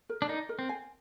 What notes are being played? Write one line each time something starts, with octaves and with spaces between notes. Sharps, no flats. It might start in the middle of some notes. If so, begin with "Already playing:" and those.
A#4
D4
D#4 D5
A#4
C4
G#5